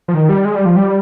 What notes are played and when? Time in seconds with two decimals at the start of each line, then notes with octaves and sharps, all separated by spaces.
0.08 F3
0.14 D#3
0.29 G3
0.45 G#3
0.55 G3
0.66 F3
0.76 G3